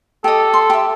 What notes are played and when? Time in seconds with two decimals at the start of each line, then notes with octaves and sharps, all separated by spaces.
0.24 G4 A4 D#5
0.54 C6
0.70 G4 E5